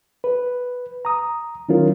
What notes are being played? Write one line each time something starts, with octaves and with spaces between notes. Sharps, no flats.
B4
A#5 D#6
D#3 F#3 C#4 E4 F4 A#4